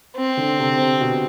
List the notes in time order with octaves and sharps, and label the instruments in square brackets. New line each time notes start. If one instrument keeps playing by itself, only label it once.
[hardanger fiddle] C4
[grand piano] D3
C3
C3
B2